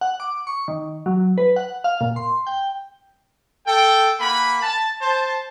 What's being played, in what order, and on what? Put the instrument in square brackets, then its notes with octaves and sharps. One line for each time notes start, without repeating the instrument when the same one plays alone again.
[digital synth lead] F#5
D6
C#6
D#3
F#3
B4
F#5
F5
A#2
C6
G5
[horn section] A4 G5
A#3 F#5 G#5 B5
A5
C5 A5